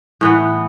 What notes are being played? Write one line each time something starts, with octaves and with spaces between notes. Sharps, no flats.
A2 E3 B3